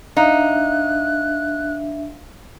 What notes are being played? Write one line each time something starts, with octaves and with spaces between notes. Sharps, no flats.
D4 D#4 E5 F5 F#6